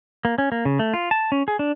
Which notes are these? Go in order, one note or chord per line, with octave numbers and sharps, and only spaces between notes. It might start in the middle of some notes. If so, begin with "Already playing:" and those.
A#3
C#4
A#3
C#3
A3
F4
A5
C#4
G#4
D4